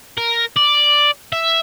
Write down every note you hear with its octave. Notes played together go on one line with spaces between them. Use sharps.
A#4
D5
E5